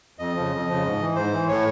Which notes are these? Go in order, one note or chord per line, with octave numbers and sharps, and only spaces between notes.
F2 D#5
C#3 F3
F2
C#3 F3
G#2
E3
G#2 C5
E3
A2 C#5